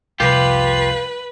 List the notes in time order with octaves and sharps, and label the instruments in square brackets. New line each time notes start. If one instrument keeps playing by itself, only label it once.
[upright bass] C2 F2 [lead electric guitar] F4 G4 [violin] B4